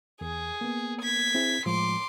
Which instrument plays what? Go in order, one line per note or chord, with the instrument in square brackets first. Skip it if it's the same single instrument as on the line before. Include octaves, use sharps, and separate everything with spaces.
[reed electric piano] E2 [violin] G#4
[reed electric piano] A#3 B3
[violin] G#6 B6
[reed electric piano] C4 E4 G#4
[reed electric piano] A2 F3 G#3 [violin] C6 D6